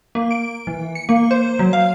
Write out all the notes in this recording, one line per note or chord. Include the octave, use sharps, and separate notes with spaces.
A#3
D7
E3
C#7
A#3
C5
F#3
F5